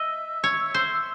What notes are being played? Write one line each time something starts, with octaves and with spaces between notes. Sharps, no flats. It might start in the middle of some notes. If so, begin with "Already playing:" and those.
Already playing: D#5 E5
C#5
C5